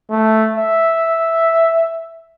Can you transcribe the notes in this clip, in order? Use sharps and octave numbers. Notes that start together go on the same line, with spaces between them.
A3
E5